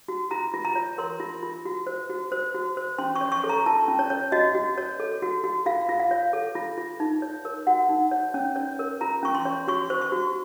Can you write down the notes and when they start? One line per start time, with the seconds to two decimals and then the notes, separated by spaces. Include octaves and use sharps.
0.08 F#4
0.31 F4 A#5
0.54 F4
0.65 A#5
0.76 C#5
0.98 A#4 C6
1.20 F4
1.43 F4
1.65 F#4
1.87 C5
2.10 F#4
2.32 C5
2.54 F#4
2.77 C5
2.98 C#4 C6
3.15 C#6
3.21 C#5
3.32 C#6
3.44 A4
3.49 A#5
3.66 F4 A5
3.88 C#4
3.99 C#5
4.10 C#5
4.32 F#4 D#5
4.55 F#4
4.78 C#5
5.00 A4
5.22 F#4
5.44 F#4
5.66 F4 F5
5.89 F4
6.00 F5
6.11 C#5
6.33 A4
6.55 F4
6.78 F4
7.00 D#4
7.22 C#5
7.45 A#4
7.67 F#4 F#5
7.89 D#4
8.11 C#5
8.34 C#4
8.56 C#5
8.79 A#4
9.01 F4 A#5
9.23 C#4 C#6
9.35 C6
9.45 C#5
9.68 F#4 C#6
9.90 C5
10.01 C#6
10.12 F#4